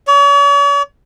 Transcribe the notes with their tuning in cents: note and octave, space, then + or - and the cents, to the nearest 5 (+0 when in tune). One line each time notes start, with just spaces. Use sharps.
C#5 +45